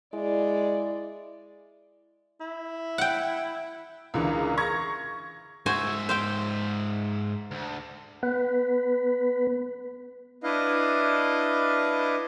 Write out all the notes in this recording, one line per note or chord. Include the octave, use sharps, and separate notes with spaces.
G#3 E4 D5
E4
F#5 G5
C#2 D3 E3 A#4
C#6 G#6 A#6
G#2 F#4 C5 E5 G#5
C5 F5 G5
D2
B3 B4
D4 E4 B4 D#5 F5